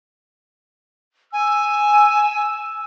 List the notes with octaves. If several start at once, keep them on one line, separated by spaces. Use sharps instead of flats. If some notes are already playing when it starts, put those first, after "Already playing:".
G#5 E6